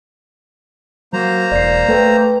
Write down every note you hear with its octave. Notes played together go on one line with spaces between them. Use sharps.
F#3 A#3 C5 A#5
E1 D5 G6 C7
A3 A4 B4 G5